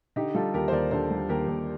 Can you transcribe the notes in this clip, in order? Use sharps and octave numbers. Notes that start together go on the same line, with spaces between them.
D3 D#4 G4
G3 F4 A4
D#2 G4 A#4
C5
D#2 A#4 D5
D3 A4 C5
G3
D#2 G4 A#4
D#2